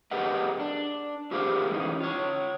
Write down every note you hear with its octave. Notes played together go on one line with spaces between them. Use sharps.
G4 G#4 A#4 B4 D#5 F#5
D4
F4 G4 G#4 A#4 C5 F5
E3 G#3 A#3 C#4 D#4
F4 C#5